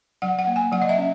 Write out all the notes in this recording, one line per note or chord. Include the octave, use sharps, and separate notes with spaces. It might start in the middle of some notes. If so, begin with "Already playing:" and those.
F#3 F#5
F#5
A#3
G#5
F#3 F#5
D#5
E5
C#4